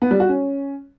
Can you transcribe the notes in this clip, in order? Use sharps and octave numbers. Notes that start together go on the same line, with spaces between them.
B3
G3
F#4
C#4